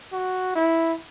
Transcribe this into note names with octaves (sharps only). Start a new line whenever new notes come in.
F#4
E4